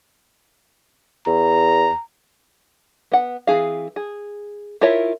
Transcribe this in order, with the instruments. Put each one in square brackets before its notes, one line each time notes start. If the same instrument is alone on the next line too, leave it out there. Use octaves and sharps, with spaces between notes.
[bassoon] E2 [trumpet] A#5
[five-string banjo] B3 F#5
E3 C4 G#4 F5
G#4
E4 F4 A#4 C#5 E5